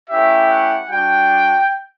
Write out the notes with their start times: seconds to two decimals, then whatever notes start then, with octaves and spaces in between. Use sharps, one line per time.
0.09 A3 C#4 E4 G4 E5
0.49 F#5
0.89 G3 D4 F#4 G5